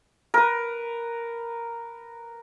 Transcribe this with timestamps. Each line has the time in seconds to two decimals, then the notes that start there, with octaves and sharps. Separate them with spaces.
0.34 A#4 B4